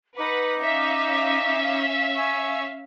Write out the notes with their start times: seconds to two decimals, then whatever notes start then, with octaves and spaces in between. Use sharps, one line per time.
0.17 D#4 B4 F#5 D6
0.60 C#4 E5 F5
2.16 G#5 C#6 E6